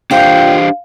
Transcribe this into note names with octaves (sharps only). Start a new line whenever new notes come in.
A#2 D4 F4 G4 C5 D#5 F5 G5